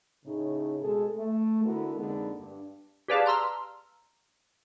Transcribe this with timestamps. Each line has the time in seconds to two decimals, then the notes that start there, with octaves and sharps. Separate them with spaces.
0.25 A2 C#3 D#4
0.80 B2 G#3 G#4 A4
1.15 A3
1.63 D3 B3 E4 F#4 A4 A#4
1.95 F2 D3 G#3 A#3 B3 D#4
2.37 G2
3.08 G4 G#4 B4 D5 F5 A5
3.26 A#5 C6 E6 F6